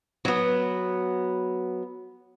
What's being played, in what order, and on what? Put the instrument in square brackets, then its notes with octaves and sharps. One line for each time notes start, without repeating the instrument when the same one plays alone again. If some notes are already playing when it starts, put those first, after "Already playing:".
[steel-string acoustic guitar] F#3 B3